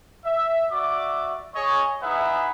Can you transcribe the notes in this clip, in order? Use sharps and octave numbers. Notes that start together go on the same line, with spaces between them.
E5
F#4 D5 E5 D6
G#4 C#5 D#5
D#4 E4 G#4 B4 E5 F#5